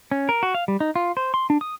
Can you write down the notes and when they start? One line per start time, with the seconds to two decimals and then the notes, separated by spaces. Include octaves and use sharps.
0.11 C#4
0.29 A#4
0.43 F#4
0.55 F5
0.68 G3
0.80 D#4
0.96 F4
1.17 C5
1.34 C6
1.50 D4
1.61 D#6